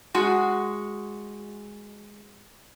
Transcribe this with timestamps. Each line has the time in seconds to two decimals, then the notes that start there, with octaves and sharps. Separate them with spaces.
0.14 G#3 F#4